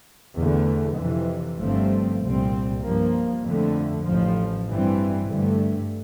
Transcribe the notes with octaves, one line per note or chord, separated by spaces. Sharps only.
E2 D3 A3
F2 C3 E3
G1 G2 F3 A3 C4
C2 A#2 G3 C4
G2 F3 A#3
F2 D3 A3
A1 A2 F3
G2 E3 G3 C4
G2 D3 A3